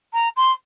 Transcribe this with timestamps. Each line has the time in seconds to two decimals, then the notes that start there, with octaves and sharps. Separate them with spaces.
0.13 A#5
0.36 C6